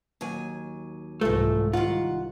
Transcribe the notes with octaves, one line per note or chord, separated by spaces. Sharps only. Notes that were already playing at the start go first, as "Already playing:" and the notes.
D#2 F#3 G#5
C2 G#2 E3 F3 A3
C2 D#3 F4 F#5